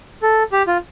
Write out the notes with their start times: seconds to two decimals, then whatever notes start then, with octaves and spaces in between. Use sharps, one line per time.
0.22 A4
0.52 G4
0.67 F4